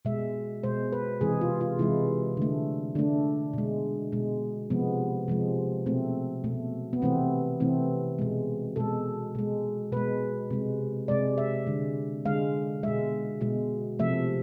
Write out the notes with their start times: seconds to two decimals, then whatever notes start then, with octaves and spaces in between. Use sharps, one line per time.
0.05 B2 G#3 E5
0.63 B2 G#3 C5
0.92 B4
1.21 C3 E3 G#3 G#4
1.41 F4
1.61 F4
1.79 C3 E3 G#3 E4
2.37 D3 A3
2.95 D3 A3 D4
3.53 B2 G#3
4.12 B2 G#3
4.70 C3 F3 G#3 B3
5.28 C3 F3 G#3
5.86 B2 A3 C4
6.44 B2 A3
6.93 B3
7.02 C3 E3 A3 C4
7.60 C3 E3 A3 C4
8.19 B2 G#3
8.76 B2 G#3 A4
9.35 B2 G#3
9.92 B2 G#3 B4
10.51 C3 G#3
11.08 C3 G#3 D5
11.38 E5
11.67 D3 G#3
12.25 D3 G#3 F5
12.83 B2 G#3 E5
13.41 B2 G#3
13.99 C3 F3 A3 E5